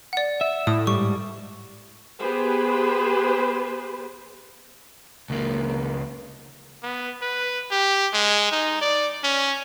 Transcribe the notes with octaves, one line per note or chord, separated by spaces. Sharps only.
D5 F#5
E5
A2 D#6
G#2 G3 C#6
B3 G4 G#4 B4 C5
C#2 A#3
B3
B4
G4
G#3
D#4
D5
C#4